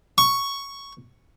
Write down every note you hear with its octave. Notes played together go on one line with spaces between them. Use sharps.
C#6